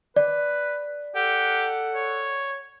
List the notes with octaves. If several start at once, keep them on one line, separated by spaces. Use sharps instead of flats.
B4 D5
G4 A4 F#5
C#5